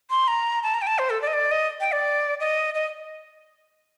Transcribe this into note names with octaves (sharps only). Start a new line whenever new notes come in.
C6
A#5
A5
A#5
G5
A5
C5
A4
D5
D#5
D5
D#5
G5
D5
D#5
D#5